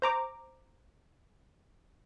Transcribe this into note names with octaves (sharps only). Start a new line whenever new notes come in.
C5 A#5 D6